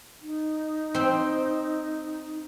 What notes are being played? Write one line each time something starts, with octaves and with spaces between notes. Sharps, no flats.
D#4
C4 G5